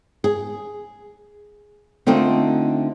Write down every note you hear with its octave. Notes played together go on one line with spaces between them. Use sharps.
G#4
D3 A3 C4 D#4 F4